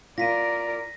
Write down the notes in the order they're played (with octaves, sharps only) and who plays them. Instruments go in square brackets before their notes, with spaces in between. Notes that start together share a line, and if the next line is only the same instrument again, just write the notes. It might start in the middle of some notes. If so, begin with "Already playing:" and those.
[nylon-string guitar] F4 [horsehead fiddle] A#4 D5 [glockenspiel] A#6 B6 D#7